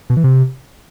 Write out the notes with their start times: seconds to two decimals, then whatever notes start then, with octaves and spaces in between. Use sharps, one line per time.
0.10 B2
0.17 E3
0.24 C3